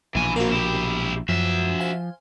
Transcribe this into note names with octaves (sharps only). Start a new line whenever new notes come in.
A#1 B2 E3 G#5
A#3 C4 F#4 A#4
E4 G4
F#2 F3 F#4 E5
C5 F5 G#5